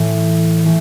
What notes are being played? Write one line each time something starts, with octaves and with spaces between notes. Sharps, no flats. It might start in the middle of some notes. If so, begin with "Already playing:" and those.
Already playing: A2 E3 A3
E3 A3